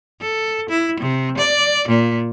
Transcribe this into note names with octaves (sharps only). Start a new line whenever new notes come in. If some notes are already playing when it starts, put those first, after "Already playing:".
A4
E4
C3
D5
A#2